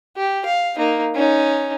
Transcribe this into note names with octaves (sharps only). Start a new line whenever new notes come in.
G4
F5
A#3 D#4
C#4 D#4